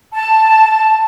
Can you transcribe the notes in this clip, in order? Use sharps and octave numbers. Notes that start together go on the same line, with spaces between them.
A5